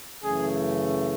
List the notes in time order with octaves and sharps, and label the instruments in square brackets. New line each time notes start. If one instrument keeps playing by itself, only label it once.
[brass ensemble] F#2 C#3 E3 A3 G#4